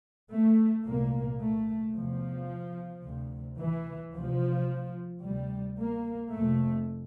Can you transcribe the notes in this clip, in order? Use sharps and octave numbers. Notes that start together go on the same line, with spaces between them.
A3
C2 A#2 A#3
A3
E2 C3 F3
D2 C3
E3
D2 C3 F3
D2 C3 G3
A#3
F2 C3 A3